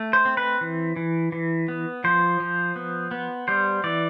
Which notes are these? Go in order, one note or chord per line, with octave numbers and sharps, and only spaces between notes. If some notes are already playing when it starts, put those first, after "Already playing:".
Already playing: A3
C5
C4
B4
E3
E3
E3
B3
F3 C5
F3
B3
B3
G3 C5
E3 D5